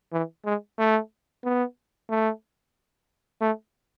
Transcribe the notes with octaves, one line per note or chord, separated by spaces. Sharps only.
E3
G#3
A3
B3
A3
A3